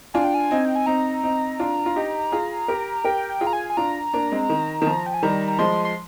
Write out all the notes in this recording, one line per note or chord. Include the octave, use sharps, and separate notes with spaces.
D4 F4 G#5
G5
G#5
C4 D#4
G5
G#5
C4 D#4 A#5
C4 D#4
D4 F4
F4
D#4 G4
F4 G#4
G4 A#4
G4 A#4 G5
G5
F4 G#4
A#5
G#5
G#5
D4 F4 A#5
A#3 D4
G#3 C4
D#3
D#3
F3
G5
G#5
D#3 G3 A#5
A#5
F3 G#3 C6
C6